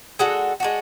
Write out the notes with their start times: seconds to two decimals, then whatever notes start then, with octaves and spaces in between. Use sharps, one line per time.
0.19 G#3 D4 F#4 A4
0.60 G#3 D4 F#4